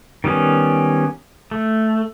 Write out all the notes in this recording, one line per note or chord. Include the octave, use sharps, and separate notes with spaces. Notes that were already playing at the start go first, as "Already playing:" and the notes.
D#3 G3 B3 C#4
A3